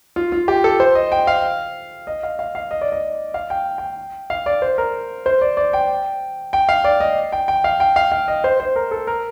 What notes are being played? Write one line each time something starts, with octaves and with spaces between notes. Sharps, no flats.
F4
F4
G4
A4
C5
D#5
G5
F5
D#5
F5
F5
F5
D#5
D5
D#5
F5
G5
G5
F5
D5
C5
A#4
C5
D5
D5
G5
G5
F5
D5
D#5
G5
G5
F5
G5
F5
F5
D#5
C5
C5
A#4
A4
A#4